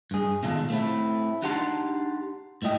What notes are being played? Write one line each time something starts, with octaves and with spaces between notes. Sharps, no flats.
G2 G#4
B2 D#3 G#3 F4 A4
A3 C4 E4
D4 D#4 G4 F#5 A5 C6
G#2 A3 E4 D#5 G5